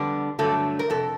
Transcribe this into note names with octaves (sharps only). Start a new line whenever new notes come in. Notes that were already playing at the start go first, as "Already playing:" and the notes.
Already playing: F2 D3 G3 B3 D4
G2 D3 F#3 A3 A4
A#4
F2 C3 A4